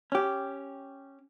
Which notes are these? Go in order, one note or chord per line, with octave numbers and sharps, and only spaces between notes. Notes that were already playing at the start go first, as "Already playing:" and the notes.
C#4 G4